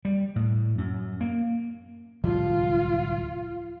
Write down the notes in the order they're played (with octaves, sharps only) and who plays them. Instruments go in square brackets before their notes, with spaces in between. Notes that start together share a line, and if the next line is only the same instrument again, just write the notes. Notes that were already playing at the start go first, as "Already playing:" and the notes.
[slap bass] G3
A2
F#2
A#3
[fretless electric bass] D1 C2 F3 [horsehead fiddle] F4